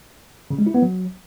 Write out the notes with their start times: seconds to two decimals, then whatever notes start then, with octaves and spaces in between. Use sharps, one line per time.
0.51 C#3
0.58 G#3
0.66 E4
0.74 B3
0.82 F#3